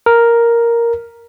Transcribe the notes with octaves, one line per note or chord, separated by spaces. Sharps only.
A#4